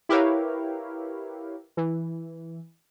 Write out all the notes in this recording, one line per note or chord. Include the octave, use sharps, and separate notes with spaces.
E4 G4 A#4 B4 C#5 F5
E3